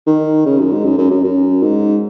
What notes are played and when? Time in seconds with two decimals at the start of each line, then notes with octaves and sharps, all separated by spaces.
0.07 D#3
0.46 C#3
0.59 F#2
0.72 G#2
0.85 F#2
0.98 F#2
1.11 F#2
1.24 F#2
1.62 G#2